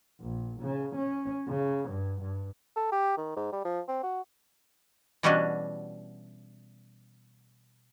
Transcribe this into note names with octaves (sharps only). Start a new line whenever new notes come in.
A#1
C#3
C#4
C#3
G2
G2
A4
G4
D#3
G#2
G3
F3
C4
F#4
B2 E3 G3 C#4 D4 F#4